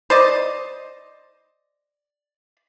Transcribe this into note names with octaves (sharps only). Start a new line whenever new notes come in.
C5 D5 D#5